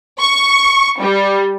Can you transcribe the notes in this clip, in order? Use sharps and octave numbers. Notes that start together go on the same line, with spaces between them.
C#6
G3